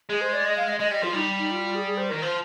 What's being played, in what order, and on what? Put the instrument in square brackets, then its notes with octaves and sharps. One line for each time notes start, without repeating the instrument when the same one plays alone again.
[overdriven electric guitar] G#3 [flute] G#4
[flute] C5
D5
D#5
F5
D#5
[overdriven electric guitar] G#3 [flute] D#5
[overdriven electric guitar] G3 [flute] D#5
[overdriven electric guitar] F3 [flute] F4
[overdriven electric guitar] G3 [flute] D#4
[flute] D#4
F4
F4
G#4
G#4
C5
[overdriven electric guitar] D#3 [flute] A#4
[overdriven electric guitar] F3 [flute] C5